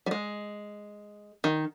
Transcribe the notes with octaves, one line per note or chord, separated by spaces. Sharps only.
G3
G#3
D#3